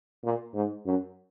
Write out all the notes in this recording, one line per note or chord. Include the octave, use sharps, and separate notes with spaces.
A#2
G#2
F#2